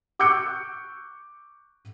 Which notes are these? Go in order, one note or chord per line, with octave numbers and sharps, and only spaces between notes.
C#6 D6 E6 F#6 G6 C#7